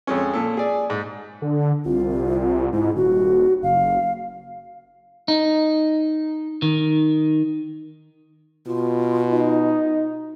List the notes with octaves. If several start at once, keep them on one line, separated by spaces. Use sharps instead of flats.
F2 G#3 C#4
A#2 A4
G#4 D5
G#2
D3
C2 F4
G#2 E4
D#1 F#4
F#1 F5
D#4
D#3
B2 F4
D#4